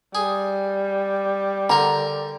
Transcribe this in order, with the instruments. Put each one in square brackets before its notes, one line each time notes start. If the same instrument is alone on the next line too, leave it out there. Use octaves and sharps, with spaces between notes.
[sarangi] G3 [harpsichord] G#4
[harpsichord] D3 A#4 [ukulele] A#5